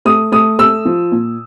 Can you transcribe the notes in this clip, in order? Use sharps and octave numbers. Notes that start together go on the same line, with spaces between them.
A3 D#6
A3 D#6
A3 E6
F3
A#2